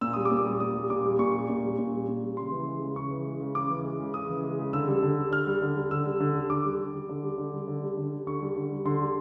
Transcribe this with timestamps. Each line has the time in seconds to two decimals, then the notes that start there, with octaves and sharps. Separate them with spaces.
0.01 A#2 E6
0.13 G3 D#6
0.25 D6
0.31 A#2
0.37 D#6
0.45 G3
0.60 A#2 D#6
0.75 G3
0.90 A#2 D6
1.04 G3
1.19 A#2 C#6
1.35 G3
1.49 A#2
1.64 G3
1.78 A#2
1.94 G3
2.08 A#2
2.23 G3
2.37 C#3 C6
2.52 E3
2.67 G#3
2.82 C#3
2.96 C#3 C#6
3.10 E3
3.26 G#3
3.40 C#3
3.55 C#3 D6
3.70 E3
3.84 G#3
4.00 C#3
4.14 C#3 D#6
4.29 E3
4.44 G#3
4.58 C#3
4.73 D3 E6
4.88 G3
5.03 D3
5.17 G3
5.31 D3 F6
5.47 G3
5.62 D3
5.76 G3
5.91 D3 E6
6.06 G3
6.20 D3
6.35 G3
6.50 D3 D6
6.65 G3
6.80 D3
6.94 G3
7.09 D3
7.23 G3
7.38 D3
7.53 G3
7.68 D3
7.83 G3
7.97 D3
8.12 G3
8.27 D3 C#6
8.42 G3
8.56 D3
8.71 G3
8.85 D3 C6
9.00 G3